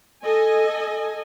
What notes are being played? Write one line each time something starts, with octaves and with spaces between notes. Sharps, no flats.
A4 D#5 G#5